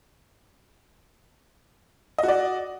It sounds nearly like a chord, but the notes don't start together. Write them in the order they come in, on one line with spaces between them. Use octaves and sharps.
D#5 F#4 D5